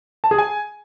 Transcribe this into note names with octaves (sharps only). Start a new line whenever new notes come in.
A5
G#4
G#5